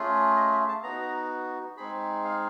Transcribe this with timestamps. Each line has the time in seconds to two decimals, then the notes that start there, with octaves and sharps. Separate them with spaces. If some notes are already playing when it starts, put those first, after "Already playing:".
Already playing: A3 C#4 F4 G#4
0.36 D#5
0.52 E5
0.69 A5
0.83 B3 D#4 F#4 A#5
1.77 G#3 C4 D#4 G#4 B5
2.24 F5